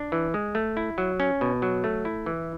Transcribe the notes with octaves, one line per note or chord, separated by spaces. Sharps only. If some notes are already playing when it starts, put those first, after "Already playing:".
Already playing: D4
E3
G#3
A3
E4
F#3
C#4
B2
F#3
A3
E4
E3